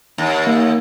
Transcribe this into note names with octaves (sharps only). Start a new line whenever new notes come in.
D#2
A#3